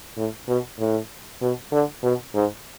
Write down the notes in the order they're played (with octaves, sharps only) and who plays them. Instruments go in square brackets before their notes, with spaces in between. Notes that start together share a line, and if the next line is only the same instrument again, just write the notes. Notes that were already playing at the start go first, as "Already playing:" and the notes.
[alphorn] A2
B2
A2
B2
D3
B2
G#2